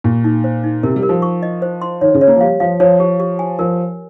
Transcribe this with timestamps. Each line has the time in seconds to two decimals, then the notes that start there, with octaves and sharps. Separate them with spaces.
0.04 A#2 G4
0.24 D#4
0.44 C5
0.64 D#4
0.83 C3 A#4
0.96 G3
1.03 A#4
1.09 F3
1.22 C#6
1.43 D#5
1.62 C5
1.82 C6
2.01 D#3 C#5
2.14 C#3
2.21 C#5
2.28 A#3
2.36 F3
2.41 G3 F5
2.60 F3 F5
2.80 F3 C#5
3.00 G4
3.20 G4
3.39 G#5
3.59 F3 A#4